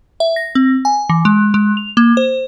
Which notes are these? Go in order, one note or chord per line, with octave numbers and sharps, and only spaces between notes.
E5
A#6
C4
G#5
E3
G#3
G#3
F7
A#3
C5